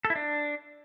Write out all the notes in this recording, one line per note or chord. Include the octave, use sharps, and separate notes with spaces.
A4
E4
D4